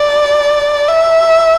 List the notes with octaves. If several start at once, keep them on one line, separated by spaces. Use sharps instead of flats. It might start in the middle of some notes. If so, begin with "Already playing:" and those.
Already playing: D5
E5